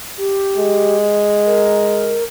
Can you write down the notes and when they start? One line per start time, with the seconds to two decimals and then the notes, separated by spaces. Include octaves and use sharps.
0.18 G4
0.58 G#3
1.46 A#4